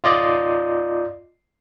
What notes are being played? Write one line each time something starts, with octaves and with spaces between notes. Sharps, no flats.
F4 D5 D#5